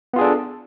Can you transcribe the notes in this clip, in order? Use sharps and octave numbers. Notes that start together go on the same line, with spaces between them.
B3 D4 F4 G#4 A4